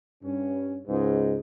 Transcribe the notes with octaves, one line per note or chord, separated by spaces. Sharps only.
G2 C#4
C#2 G#2